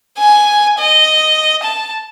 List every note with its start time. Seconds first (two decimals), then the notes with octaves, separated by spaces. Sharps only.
0.18 G#5
0.79 D#5
1.63 A5